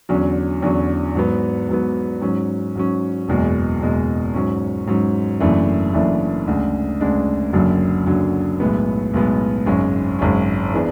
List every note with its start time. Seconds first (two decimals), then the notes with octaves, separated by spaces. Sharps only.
0.09 E2 D3 F#3 C#4
0.62 E2 D3 F#3 C#4
1.15 G#2 F#3 B3
1.69 G#2 F#3 B3
2.22 G#2 F#3 C#4
2.75 G#2 F#3 C#4
3.28 F#1 E2 B2 G#3
3.81 F#1 E2 B2 G#3
4.34 G#2 F#3 C#4
4.87 G#2 F#3 C#4
5.40 F#1 F#2 E3 A3 D4
5.94 F#1 F#2 E3 A3 D4
6.47 D2 C#3 G#3 D4
7.01 D2 C#3 G#3 D4
7.53 F#1 F#2 D3 F#3
8.07 F#1 F#2 D3 F#3
8.60 B1 A2 G#3 B3
9.14 B1 A2 G#3 B3
9.66 G#1 F#2 C#3 G#3 C#4
10.19 G#1 F#2 C#3 G#3 C#4
10.73 E3 B3 D4 G#4